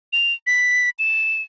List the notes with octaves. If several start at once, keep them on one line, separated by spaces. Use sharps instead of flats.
F7
B6
E7